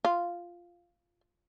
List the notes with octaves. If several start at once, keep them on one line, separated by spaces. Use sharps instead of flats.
F4